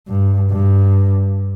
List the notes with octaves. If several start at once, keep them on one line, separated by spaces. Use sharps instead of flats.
G2
G2